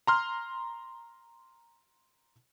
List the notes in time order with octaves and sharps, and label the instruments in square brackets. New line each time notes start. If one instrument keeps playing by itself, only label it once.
[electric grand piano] A#5 C6 F6